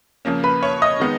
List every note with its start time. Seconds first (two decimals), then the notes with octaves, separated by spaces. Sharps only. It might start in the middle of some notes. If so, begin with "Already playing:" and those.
0.25 C#3 F3 A#3 C#4
0.44 B4 B5
0.63 C#5 C#6
0.82 D#5 D#6
1.00 D#3 G#3 B3 D#4